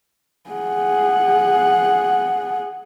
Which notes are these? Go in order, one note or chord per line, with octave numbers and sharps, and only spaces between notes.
G#4 F#5